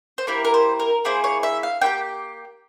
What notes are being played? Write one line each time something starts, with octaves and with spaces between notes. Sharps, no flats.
C5
A#3 E4 G4 A#4
A#4
C5
A#4
A#3 E4 G#4 C5
C#5
E5
F5
A#3 E4 G4 G5